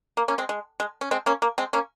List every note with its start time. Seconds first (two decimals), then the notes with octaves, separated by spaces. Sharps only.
0.17 A#3
0.28 A#3 C#4
0.38 G#3 C4
0.49 G#3
0.80 G#3
1.01 C#4
1.11 G#3 C4
1.26 A#3 C#4
1.42 A#3
1.58 G#3 C4
1.73 A#3 C#4